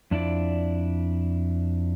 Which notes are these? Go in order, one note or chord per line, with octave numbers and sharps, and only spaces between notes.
F2 D4 E4 D5